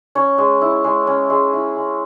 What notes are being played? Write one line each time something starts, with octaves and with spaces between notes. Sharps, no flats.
C#4 C#5
G#3
E4
G#3
C#4
G#3
E4
G#3